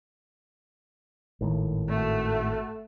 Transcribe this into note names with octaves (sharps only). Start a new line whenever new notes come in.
G#1 A2 D#3
A3 F#4